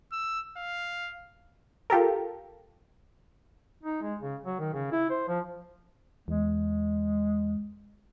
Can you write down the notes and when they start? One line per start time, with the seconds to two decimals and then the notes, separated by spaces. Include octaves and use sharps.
0.12 E6
0.57 F5
1.90 F4 G4 A4 A#4
3.83 D#4
4.02 G#3
4.21 C#3
4.46 F#3
4.60 D#3
4.74 C#3
4.92 E4
5.10 C5
5.28 F3
6.28 E2 G#3